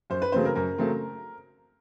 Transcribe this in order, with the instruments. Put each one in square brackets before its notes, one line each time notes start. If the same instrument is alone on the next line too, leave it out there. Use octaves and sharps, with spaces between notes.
[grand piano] F#2 C5
B4
C#3 F#3 A3 C4 C5
A#4
F#2 A#4
C#3 F#3 A3 C4